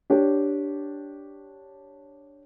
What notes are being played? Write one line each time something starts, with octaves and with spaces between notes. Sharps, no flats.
D4 G4 C#5